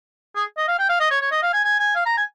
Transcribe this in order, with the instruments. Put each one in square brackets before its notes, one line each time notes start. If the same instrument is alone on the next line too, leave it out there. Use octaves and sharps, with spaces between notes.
[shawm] G#4
D#5
F5
G5
F5
D#5
C#5
C#5
D#5
F5
G#5
G#5
G#5
F5
A#5
G#5